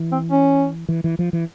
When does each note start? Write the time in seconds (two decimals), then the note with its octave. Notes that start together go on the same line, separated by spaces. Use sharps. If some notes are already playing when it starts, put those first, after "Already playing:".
Already playing: E3
0.12 C4
0.31 C#4
0.89 E3
1.04 E3
1.19 F3
1.33 E3